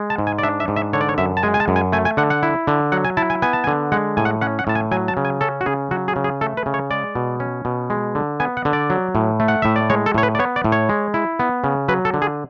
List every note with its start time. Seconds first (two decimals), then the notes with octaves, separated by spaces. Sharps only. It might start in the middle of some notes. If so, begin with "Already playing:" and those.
Already playing: G#3
0.10 A5
0.18 G#2
0.27 G#5
0.39 D5
0.43 D4 E5
0.60 E5
0.68 G#2
0.76 E5
0.93 D3 C#5
1.01 D5
1.09 C#5
1.18 F#2 E5
1.37 A5
1.43 G#3 G#5
1.54 G#5
1.60 A5
1.68 F#2
1.76 G#5
1.92 A3 G#5
2.05 G#5
2.17 D3 F#5
2.30 F#5
2.43 E4
2.67 D3
2.92 F#3 F#5
3.05 G#5
3.17 E4 A5
3.30 G#5
3.42 B3 G#5
3.53 A5
3.64 D3 G#5
3.92 G#3 F#5
4.17 A2 G#5
4.25 F#5
4.41 C#4 F#5
4.59 F#5
4.67 A2 A5
4.75 G#5
4.91 F#3 G#5
5.08 A5
5.17 C#3
5.25 G#5
5.41 C#4 A4
5.61 F#4
5.66 C#3 G#4
5.91 F#3 F#4
6.08 G#4
6.16 C#3
6.24 G#4
6.41 A3 A4
6.57 B4
6.66 C#3
6.74 C#5
6.90 G#3 D5
7.15 B2
7.40 C#4
7.65 B2
7.90 G#3
8.15 D3
8.40 B3 G#5
8.57 F#5
8.65 D3
8.73 D5
8.90 F#3
9.15 A2
9.40 A3
9.48 F#5
9.62 A2 E5
9.76 D5
9.90 G#3 C#5
10.06 A4
10.14 A2 C#5
10.23 B4
10.35 D5
10.39 B3 C#5
10.56 D5
10.64 A2
10.72 C#5
10.89 G#3
11.14 E4
11.39 B3
11.64 C#3
11.88 F#3 B4
12.05 A4
12.14 D3
12.22 G#4